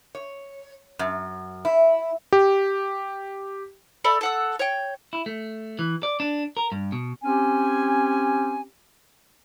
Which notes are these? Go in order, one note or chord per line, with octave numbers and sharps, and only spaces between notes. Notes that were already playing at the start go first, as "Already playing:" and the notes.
C#5
F#2
E4
G4
A4 D5 E5 B5
A4 F#5 E6
C#5 G5
E4
A3
E3
D5
D4
A#4
G2
B2
C4 C#4 G4 G#5